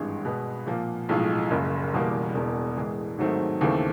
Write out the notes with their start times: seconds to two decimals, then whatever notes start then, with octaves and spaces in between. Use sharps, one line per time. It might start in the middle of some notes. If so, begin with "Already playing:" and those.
Already playing: G#1 G2 E3 G#3
0.25 B2 G#3 B3
0.67 A#2 F3 A#3
1.09 B1 A2 F3 G#3
1.51 F#1 F#2 C#3
1.93 E1 E2 B2 G3 A#3
2.35 E1 E2 B2
2.76 A2 E3 G#3
3.18 G#2 D#3 F#3 A3 C4
3.61 D#2 C#3 E3 A3 C4